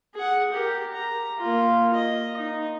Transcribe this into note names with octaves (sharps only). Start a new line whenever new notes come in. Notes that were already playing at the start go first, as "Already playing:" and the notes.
G#4 F#5
G4 A#4
A#5
A#3 F4
D#5
D#4